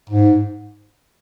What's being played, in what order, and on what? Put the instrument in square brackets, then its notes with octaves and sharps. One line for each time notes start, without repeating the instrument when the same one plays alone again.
[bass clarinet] G#2